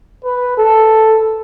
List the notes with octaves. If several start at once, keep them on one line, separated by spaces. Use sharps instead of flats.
B4
A4